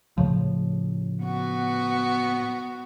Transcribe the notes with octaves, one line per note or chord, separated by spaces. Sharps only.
A2 C#3 F3
B3 F#4